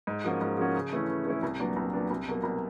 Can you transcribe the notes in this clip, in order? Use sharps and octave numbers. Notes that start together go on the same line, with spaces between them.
G#2
F3 A#3 C#4 F#4
G#2
F3 A#3 C#4 F#4
C#3
E3 A3 C#4 E4
C#3
E3 A3 C#4 E4
C2
A#2 F#3 B3 D4
C2
A#2 F#3 B3 D4
C2
B2 F#3 A#3
C2